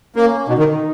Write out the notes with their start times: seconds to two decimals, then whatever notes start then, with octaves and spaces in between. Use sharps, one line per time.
0.16 A#3 C#4
0.48 B2 D#4
0.59 D#3